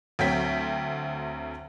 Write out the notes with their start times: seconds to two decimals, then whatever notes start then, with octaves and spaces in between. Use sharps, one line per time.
0.19 D2 F#3 C4 G5 B6